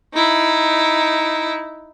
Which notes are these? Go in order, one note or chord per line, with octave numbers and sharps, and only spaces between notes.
D#4 E4